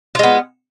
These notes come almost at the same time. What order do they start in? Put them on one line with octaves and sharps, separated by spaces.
F4 G#3 B3